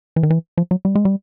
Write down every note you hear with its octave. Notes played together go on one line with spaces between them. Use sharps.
E3
D#3
E3
F3
F#3
G3
G#3
G3